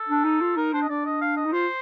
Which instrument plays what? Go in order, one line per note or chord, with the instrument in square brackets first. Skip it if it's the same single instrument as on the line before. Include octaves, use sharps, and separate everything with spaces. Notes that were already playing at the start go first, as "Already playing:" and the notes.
Already playing: [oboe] A4
[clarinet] D4
D#4
F4
[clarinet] D#4 [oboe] A#4
[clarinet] D4 [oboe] C5
[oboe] D#5
[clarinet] D4 [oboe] D5
[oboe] D#5
F5
D#5
[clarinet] D#4
[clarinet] F4 [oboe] C5